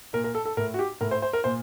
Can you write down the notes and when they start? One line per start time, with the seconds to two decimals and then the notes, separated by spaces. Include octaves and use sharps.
0.13 A#2 A#4
0.24 A#4
0.35 A4
0.45 A4
0.57 A2 A#4
0.74 F#4
0.79 G4
1.01 A2 A#4
1.11 C5
1.22 C5
1.33 A#4
1.44 A#2 C5